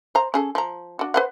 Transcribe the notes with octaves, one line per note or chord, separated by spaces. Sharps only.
C5 A#5
C#4 G#4 A4
F3 A#5
D4 F#4
B4 C5 F#5